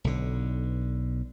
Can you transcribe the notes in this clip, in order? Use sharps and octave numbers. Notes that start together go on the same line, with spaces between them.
B1 D3